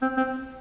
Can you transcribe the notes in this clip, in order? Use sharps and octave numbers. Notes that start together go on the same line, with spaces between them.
C4
C4